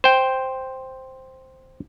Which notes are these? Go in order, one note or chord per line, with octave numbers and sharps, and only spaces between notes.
C5 G5